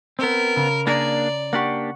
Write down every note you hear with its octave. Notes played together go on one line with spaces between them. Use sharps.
B3 C4 A#4
C#3
A#3 D4 G#4 D5 A#5
A#3 D4 G4 F#5 C#6